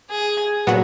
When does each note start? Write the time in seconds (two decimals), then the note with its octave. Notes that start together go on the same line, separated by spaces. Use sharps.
0.10 G#4
0.67 A#2 F#3 B3 F#4